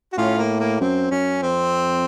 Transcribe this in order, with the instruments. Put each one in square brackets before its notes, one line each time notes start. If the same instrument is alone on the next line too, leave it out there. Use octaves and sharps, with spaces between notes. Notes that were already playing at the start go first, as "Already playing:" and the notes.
[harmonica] F#4
[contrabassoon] A2 [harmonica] C#4 F4
[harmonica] A#3
A#3
[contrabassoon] F#2 [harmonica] C4
[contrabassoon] F#2 [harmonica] C#4
[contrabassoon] F2 [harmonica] C4